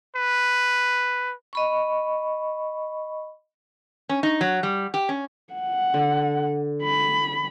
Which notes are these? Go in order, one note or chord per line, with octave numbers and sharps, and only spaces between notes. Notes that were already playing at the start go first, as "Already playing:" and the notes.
B4
D#5 B5 C#6
C#4
D#4
F#3
G3
G4
C#4
F#5
D3
B5